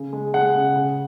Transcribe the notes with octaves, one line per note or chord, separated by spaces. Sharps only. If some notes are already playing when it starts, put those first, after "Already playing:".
Already playing: C#3
G#3
G#3 F#5
C#3
C#3